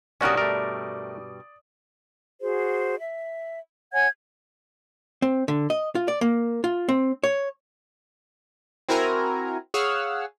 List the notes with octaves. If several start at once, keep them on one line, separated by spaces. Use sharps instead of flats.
G2 B2 G3 C#4 F#4 A#4 D5 D#6
A3 A#4
F#4 G#4 C5
E5
C#5 F#5 G#5 G#6
C4
D3
D#5
F4
D5
A#3
F4
C4
C#5
C4 E4 F#4 A#4 G#5 A#5
G#4 C#5 F5 F#5 E6 F6